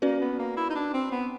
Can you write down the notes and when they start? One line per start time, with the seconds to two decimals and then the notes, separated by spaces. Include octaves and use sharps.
0.02 A#3 C#4 F#4 B4 D5
0.21 B3
0.39 A#3
0.57 E4
0.70 D#4
0.75 D4
0.94 C4
1.12 B3